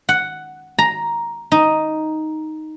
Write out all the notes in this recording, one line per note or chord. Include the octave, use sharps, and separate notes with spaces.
F#5
A#5
D#4